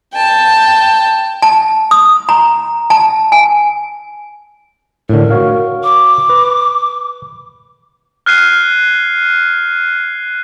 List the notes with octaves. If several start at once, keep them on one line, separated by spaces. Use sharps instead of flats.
G5 A5
A5
D#6
A#5
A5
G#5
A2 D3 A#4
F#4 C#5 F5
D6
B4
F6 F#6 G#6 C7 D#7